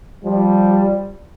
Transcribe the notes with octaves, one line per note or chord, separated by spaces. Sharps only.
F3 G3